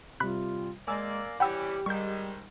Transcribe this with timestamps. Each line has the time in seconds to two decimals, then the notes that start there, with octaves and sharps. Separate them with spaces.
0.20 C3 G3 F4 B5 F#6
0.88 G#3 A#3 D5 G#5 E6
1.40 E3 G3 C#4 G4 F#5 G5 B5 E6
1.86 G#2 D#3 G3 C#6 G6